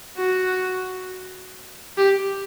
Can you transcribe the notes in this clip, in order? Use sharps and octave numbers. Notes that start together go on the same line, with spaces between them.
F#4
G4